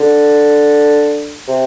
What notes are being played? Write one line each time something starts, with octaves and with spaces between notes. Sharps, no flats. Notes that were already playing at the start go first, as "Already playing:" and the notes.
Already playing: D3
C3